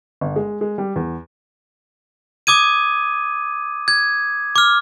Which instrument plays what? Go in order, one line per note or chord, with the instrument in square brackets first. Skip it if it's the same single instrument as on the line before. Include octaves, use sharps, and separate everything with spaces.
[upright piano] G1
G#3
G#3
G3
E2
[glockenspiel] D6 D#6 G#6 D#7
G#6
D6 F6